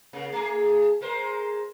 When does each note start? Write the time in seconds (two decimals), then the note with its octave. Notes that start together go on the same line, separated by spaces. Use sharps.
0.13 C#3 A#3
0.32 A3 G#4
1.01 G#3 A#4 C5